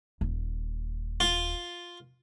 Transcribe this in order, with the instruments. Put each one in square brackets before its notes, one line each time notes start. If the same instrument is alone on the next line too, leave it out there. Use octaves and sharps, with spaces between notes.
[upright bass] D#1
[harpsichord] F4